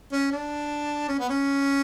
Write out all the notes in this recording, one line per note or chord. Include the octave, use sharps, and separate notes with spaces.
C#4
D4
C#4
B3
C#4